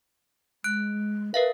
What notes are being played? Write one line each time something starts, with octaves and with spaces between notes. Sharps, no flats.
G#3 F#6 D7
A#4 B4 E5 F5